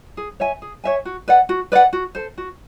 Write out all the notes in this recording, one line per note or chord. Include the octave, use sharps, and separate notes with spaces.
G#4
C#5 E5 G#5
G#4
C#5 E5 G#5
F#4
B4 D5 F#5
F#4
B4 D5 F#5
F#4
A4 C5
F#4